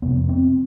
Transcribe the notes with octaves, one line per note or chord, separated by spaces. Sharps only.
F2 C3 B3
C4